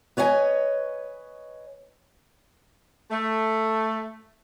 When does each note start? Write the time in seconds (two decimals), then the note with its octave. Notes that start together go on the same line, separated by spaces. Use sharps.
0.17 B4 C#5 D#5 E5 G#5
3.11 A3